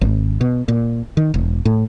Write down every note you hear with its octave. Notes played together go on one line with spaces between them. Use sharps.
G#1
B2
A#2
D#3
E1
A2